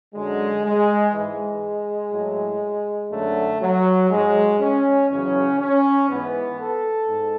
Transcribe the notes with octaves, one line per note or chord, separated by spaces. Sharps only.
F#2 D3 F#3 G#3
G#3
G#2 E3 G#3
A2 F#3
F#2 D3 F#3 A3
F#3
G#2 F#3 G#3
C#4
E2 C#3 F#3 C#4
C#4
G#2 E3 B3
A4
G#2